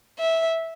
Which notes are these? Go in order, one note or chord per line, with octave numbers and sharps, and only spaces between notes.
E5